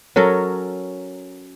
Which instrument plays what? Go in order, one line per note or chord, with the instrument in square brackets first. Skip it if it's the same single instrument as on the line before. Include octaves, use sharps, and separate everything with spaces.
[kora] F#3 C#4 A4 A#4